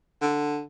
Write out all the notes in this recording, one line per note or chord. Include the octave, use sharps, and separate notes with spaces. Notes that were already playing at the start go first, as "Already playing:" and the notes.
D3